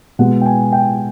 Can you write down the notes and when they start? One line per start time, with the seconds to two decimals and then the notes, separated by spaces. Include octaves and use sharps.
0.19 B2 G#3 B3 F#5
0.41 G5
0.46 G#5
0.73 G5